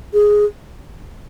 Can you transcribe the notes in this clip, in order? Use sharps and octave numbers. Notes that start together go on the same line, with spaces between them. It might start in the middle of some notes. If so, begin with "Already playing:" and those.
G#4